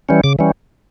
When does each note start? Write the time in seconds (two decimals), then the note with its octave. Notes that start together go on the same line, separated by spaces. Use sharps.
0.09 E3 G3 C#4
0.24 C#3 D6
0.39 E3 G3 C#4